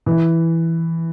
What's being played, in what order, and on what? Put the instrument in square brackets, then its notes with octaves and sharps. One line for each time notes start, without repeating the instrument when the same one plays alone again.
[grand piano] E3